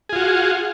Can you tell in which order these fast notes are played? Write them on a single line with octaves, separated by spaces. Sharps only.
G#4 F4 F#4